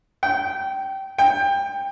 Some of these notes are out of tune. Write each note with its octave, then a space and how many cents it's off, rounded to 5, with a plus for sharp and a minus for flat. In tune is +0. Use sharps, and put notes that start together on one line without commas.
G5 -20
G5 +20